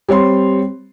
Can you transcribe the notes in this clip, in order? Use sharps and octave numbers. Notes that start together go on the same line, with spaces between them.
G3 C4 C#5 C6